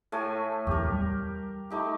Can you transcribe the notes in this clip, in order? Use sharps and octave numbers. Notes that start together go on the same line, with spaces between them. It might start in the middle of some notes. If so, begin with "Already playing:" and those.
A2 A3 G#5
D1 G#1 E2 G4 A#4
G3
A3 D#4 G4